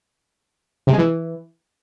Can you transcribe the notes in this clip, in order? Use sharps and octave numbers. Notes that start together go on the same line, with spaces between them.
C3
G#3
E3